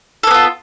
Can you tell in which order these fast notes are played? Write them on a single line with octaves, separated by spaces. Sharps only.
A4 A#3 B3 F4